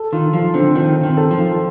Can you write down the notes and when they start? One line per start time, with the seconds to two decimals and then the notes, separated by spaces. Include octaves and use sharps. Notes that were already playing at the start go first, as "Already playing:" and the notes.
Already playing: A4
0.12 D#3 F4
0.33 F3 F4
0.54 D3 C4
0.76 D#3 C4
0.96 C4
1.03 D#3
1.17 A4
1.31 F3
1.38 F4